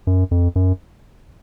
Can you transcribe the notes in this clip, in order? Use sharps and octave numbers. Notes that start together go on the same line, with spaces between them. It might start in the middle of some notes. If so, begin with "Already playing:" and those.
F#2
F2
F#2